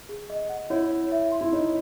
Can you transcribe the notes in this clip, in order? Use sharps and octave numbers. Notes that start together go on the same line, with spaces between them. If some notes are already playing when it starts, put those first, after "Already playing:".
G#4
D#5
F#5
E4 C#5
C#5
E5
C6
E4
D#4 C#5